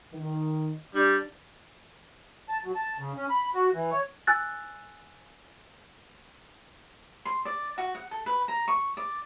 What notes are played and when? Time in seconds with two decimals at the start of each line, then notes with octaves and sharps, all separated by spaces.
0.13 D#3
0.95 G3 D4
2.49 A5
2.64 F#3
2.75 A5
2.98 C#3
3.15 C#4
3.30 B5
3.54 F#4
3.73 E3
3.91 C#5
4.27 G#5 E6 F#6 A6
7.25 C6
7.45 D5
7.78 F#4
7.95 F#5
8.11 A4
8.26 B4
8.48 A#5
8.68 C#6
8.97 D5